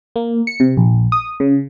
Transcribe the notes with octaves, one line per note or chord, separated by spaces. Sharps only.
A#3
C#7
C3
A#1
D#6
C#3